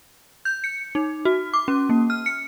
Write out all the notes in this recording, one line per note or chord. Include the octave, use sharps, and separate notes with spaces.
G6
C#7
D#4
F#4
D6
C#4
A#3
F6
C#7